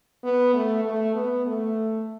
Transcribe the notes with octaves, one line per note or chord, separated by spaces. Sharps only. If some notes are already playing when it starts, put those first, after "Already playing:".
B3
A3
A3
B3
A3